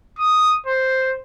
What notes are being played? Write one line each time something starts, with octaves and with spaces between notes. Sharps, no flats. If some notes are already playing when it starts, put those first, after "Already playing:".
D#6
C5